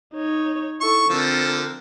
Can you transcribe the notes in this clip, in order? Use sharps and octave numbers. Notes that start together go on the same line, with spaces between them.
D#4 C#5
E4 A4 C#6
D3 F3 C4 A4 A#4